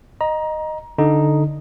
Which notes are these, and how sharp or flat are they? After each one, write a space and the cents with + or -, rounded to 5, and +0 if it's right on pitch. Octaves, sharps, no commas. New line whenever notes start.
D#5 -10 A#5 +20
D3 +0 D#4 +0